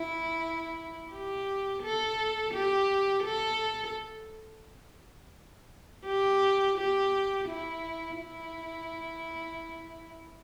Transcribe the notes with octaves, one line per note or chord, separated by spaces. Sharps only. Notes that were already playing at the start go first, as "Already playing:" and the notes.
Already playing: E4
G4
A4
G4
A4
G4
G4
E4
E4